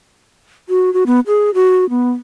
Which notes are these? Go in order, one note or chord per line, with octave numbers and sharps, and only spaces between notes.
F#4
F#4
B3
G#4
F#4
B3